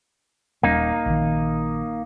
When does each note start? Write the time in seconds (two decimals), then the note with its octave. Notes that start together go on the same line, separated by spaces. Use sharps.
0.63 D#1 G3 A#3 C#4 D#4
1.06 A#1 D#3